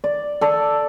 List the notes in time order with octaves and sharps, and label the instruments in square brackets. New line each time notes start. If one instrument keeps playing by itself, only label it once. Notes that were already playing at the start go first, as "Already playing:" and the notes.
[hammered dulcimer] D5
A4 D5